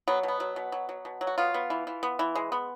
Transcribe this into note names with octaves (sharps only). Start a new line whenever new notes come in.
F#3 B3
B2
B3
F#3
B2
F#3
F#3
B2
F#3
F#4
B3 F4
B3
E3
E3
B3
E3
G#3
B3